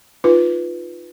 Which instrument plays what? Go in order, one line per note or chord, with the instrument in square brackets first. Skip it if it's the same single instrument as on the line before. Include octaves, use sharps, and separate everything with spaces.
[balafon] D#4 F4 B4